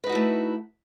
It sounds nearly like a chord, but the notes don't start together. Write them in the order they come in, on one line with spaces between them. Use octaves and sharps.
B4 D#4 F#4 E4 A3